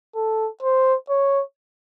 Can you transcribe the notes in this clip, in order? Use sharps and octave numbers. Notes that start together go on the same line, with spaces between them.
A4
C5
C#5